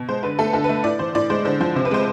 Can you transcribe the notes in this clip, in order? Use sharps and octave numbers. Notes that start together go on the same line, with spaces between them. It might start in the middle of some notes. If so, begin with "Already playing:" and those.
Already playing: B2
G#3 C5
D3 B4
A3 A4
D3 A4
B4
A3
A2 D5
E3 C5
A2 D5
G#3 C5
D3 C5
F3 C5
C3 C5
B4
G#3 C5